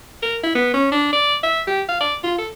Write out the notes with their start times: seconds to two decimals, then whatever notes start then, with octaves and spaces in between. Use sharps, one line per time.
0.23 A#4
0.44 E4
0.55 B3
0.74 C#4
0.92 D4
1.13 D5
1.44 E5
1.67 G4
1.89 F5
2.01 D5
2.23 F4
2.38 A4